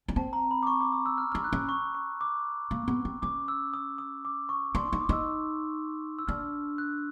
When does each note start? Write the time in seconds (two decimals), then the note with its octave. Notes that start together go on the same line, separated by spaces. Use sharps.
0.08 C#4
0.16 C4 A5
0.33 A#5
0.51 B5
0.63 D6
0.67 C#6
0.81 D6
0.93 D#6
1.06 E6
1.18 F6
1.32 D4 F6
1.44 F#6
1.53 C#4
1.69 C#6
1.95 C#6
2.21 D6
2.71 A#3
2.88 B3
3.05 C4
3.22 C#4 D6
3.48 E6
3.74 D#6
3.98 D#6
4.25 D6
4.49 C#6
4.75 D4 C6
4.88 D#4 C#6
5.01 D6
5.09 D#4 E6
6.19 E6
6.28 D4 F6
6.78 F#6